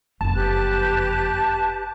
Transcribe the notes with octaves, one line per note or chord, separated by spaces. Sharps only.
F#1 F2 A5
G4 B4 F#6